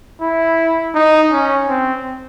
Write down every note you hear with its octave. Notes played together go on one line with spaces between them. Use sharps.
E4
D#4
C#4
C4